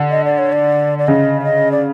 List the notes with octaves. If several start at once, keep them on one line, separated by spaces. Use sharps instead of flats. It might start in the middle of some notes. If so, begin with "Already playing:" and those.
Already playing: D3
D#5
D5
C#5
D5
D5
C#3 D#5
E5
D#5
D5